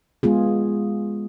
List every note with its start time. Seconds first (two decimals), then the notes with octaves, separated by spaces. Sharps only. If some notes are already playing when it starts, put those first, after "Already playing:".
0.23 G#3 B3 F4 G#4